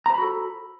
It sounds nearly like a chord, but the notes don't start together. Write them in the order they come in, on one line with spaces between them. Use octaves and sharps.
A#5 C5 B5 F#4 A4